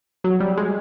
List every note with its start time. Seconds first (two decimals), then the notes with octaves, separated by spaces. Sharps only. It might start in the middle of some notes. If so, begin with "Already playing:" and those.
0.24 F#3
0.40 G3
0.57 G#3